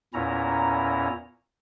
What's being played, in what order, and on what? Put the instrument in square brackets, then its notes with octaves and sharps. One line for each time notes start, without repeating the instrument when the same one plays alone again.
[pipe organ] E2 A#2 C#4 E4 A#5